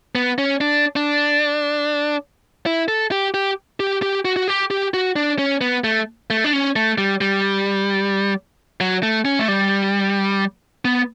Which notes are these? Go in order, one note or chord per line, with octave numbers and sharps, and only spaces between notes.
B3
C#4
D4
D4
E4
A4
G4
G4
G4
G4
F#4
F#4
G4
G4
F#4
D4
C#4
B3
A3
A3
D4
C#4
A3
G3
G3
F#3
A3
C#4
A3
G3
B3